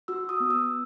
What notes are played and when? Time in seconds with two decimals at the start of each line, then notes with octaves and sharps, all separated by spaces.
0.08 F#4 E6
0.29 D#6
0.40 B3
0.50 E6